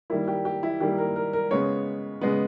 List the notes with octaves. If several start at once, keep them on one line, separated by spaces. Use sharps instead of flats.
D#3 G3 A#3 E4
G4
G4
E4
D#3 G3 A#3 G4
A#4
A#4
A#4
C#3 G#3 B3 C#5
C#3 G#3 B3